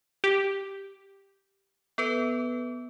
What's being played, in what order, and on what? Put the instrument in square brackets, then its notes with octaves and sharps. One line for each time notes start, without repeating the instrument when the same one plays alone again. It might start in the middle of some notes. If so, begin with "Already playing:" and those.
[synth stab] G4
[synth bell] B3 A4 B4